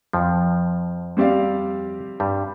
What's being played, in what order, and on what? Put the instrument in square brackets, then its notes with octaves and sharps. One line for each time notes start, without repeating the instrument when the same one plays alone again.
[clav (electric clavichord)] F2 F3
[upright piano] G3 C4 G4 D5 F5
[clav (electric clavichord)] G2 G3